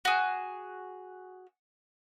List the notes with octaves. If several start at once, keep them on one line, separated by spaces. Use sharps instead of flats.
F#4 G#4